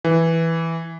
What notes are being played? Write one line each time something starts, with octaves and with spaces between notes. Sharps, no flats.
E3